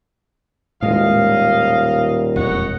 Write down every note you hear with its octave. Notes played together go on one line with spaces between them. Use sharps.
D#1 A2 G#3 D#5 F5
E1 F2 D#4 C#5 F#5